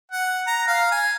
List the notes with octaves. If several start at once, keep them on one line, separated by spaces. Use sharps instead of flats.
F#5
A#5
F5
G#5